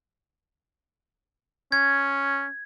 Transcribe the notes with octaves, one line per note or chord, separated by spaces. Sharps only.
C#4 G#6